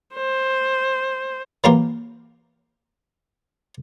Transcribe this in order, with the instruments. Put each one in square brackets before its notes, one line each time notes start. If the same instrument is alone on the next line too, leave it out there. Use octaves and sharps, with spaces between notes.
[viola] C5
[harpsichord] E3 F#3 A#3 F4 G4 A#4